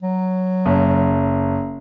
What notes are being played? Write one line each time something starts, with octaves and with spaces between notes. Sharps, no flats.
F#3
F#1